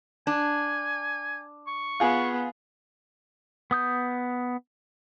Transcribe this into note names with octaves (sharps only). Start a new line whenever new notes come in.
D4 G#5
C#6
B3 F4 G#4
B3 D#6 G6